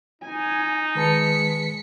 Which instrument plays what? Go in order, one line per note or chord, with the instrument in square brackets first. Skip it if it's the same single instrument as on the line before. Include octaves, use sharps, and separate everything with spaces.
[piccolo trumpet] D#4 [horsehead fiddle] G#5
[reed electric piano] D#3 B4 A5 [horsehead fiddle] G#3 [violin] B6 C#7